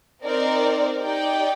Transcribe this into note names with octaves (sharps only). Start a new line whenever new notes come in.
C4 D#4 A#4 D5
D#4 G4 D5 G5